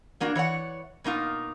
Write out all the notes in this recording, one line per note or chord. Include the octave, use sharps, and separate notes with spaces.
A2 A#3 D4 F#4
E3 C#5 D5 F#5
B2 A#3 D#4 F4